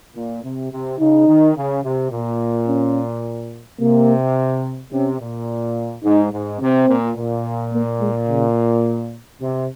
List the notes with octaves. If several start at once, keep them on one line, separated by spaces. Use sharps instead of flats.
A#2
C3
C3
C#3 D#4
D#3
C#3
C3
A#2
C#4
C3 A#3
C3 C#4
A#2
G#2 D#4
G#2
C3 C4
A#2
A#2
A#3
G#3
C#3
C3